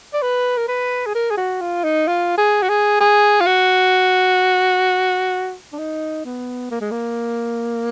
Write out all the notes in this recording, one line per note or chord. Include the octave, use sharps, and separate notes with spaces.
D5
B4
A#4
B4
G#4
A#4
G#4
F#4
F4
D#4
F4
G#4
F#4
G#4
G#4
F4
F#4
D4
D#4
B3
A#3
G#3
A#3